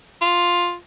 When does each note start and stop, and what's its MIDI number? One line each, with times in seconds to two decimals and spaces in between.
0.21 0.74 65